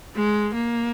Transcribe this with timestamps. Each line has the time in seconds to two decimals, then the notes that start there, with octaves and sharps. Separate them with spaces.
0.15 G#3
0.54 A#3